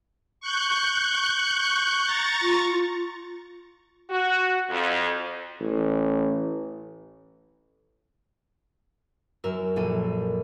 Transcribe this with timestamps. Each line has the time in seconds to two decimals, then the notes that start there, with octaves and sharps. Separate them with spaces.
0.41 C#6 F#6 G6
2.05 A#5 C#6 A6
2.42 F4
4.10 F#4
4.70 F2
5.61 A1
9.44 F#2 A#4 E6
9.76 A#1 A4 D#7